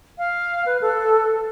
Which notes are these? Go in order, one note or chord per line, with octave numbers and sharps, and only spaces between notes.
F5
B4
A4